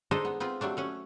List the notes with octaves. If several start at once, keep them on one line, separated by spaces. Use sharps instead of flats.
G#3 D4 D#4 A4 C5 D#5
B3
B3 C4 F4 B4
F#3 G3 A3 D4
A3 C#4 F#5